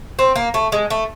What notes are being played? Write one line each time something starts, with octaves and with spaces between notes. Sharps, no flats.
C4
A#3
A3
G#3
A3